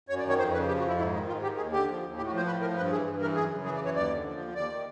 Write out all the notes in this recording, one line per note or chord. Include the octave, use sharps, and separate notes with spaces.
F#2 C#5
D5
D#3 C#5
F2 C5
C#3 B4
F3 G4
F#4
F2 E4
G#2 E4
D#3 D#4
G#2 F4
D#3 G4
D#2 G#4
D3 G4
F3
D#2
A2 G4
F#4
F3 C5
A2 B4
F3 A#4
G2 B4
E3 G#4
G2
E3 A#4
F#2 G#4
C#3
E3 G#4
D5
F#2 C#5
D#2 D5
D3
F3
D#2
D#2 D5
D#3